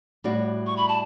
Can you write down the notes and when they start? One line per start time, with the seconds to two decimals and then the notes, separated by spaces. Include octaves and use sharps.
0.24 A2 G3 D4 F#4
0.66 C#6
0.77 B5
0.88 A5